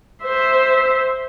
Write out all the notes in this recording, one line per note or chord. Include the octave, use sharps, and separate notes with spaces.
C5 E5